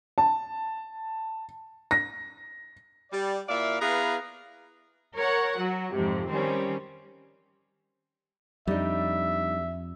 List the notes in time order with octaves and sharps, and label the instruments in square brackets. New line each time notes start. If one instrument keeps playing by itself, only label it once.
[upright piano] A5
A#6
[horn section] G3 D5
A#2 E4 D5 E5 F5
B3 E4 G#4 B4 F5 A#5
[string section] A#4 C#5 F#5
F#3 F#4
F2 G#2 C3
D#3 G3 C4 C#4
[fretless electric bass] F2 [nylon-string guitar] G3 D4 D#4 [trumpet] E5